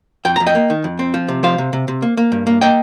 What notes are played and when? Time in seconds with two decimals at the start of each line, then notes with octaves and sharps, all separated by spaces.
0.25 F2 G5
0.36 F2 A#5
0.46 D#5 G5
0.55 A#3
0.70 D#3
0.84 F2
0.99 C4
1.14 F3
1.28 C3
1.43 F3 C5 F5
1.58 C3
1.73 C3
1.88 C3
2.02 A#3
2.17 A#3
2.32 G2
2.47 A#3
2.61 A#3 D#5 G5